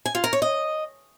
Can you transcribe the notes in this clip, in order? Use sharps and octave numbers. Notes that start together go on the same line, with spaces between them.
G#5
F4
A#4
C#5
D#5